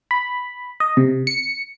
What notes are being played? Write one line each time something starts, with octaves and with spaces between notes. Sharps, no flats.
B5
D#5
C3
C#7